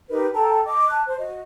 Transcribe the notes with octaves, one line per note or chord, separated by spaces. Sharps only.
D#4 G4 A#4 B4
A4 G5 A5 A#5
D#5 D6
A5 F#6
C5
F#4 D#5